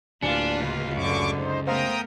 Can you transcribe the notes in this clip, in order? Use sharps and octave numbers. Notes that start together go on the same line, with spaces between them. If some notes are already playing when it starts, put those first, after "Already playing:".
D1 A#3 D4 F4 B4 G#5 C#7
C#2
F#2 D3 C#6 D6
D#4 C5
A3 B3 A#4 C5 F5 G5 A#5 D#6